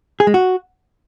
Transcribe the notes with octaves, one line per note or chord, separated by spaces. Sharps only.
G#4
G#3
F#4